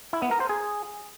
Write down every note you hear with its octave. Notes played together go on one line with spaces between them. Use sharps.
E4
B3
A#4
C5
G#4